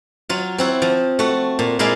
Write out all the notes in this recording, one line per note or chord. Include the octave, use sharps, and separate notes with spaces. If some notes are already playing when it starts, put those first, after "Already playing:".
F#3 F4
C4 E4 F#4
F3
A3 F#4
A#2
A#2 G#3 E4 D5 F5 G#5